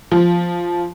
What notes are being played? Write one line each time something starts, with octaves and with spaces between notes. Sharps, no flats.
F3